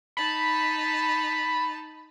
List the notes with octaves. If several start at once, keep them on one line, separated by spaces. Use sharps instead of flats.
D#4 A5 B5